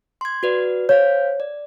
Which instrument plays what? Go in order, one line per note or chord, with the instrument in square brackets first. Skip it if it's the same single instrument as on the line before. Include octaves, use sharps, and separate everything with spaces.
[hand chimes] C6 G#6
F#4 B4 D5
[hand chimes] C5 F5 G6 [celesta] C#5
[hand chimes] D5